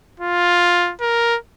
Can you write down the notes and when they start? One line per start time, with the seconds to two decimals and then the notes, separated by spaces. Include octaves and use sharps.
0.20 F4
1.01 A#4